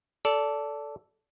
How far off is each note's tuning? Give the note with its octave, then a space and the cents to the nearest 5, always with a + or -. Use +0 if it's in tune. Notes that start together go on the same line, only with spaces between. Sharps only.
A4 +0 D5 -20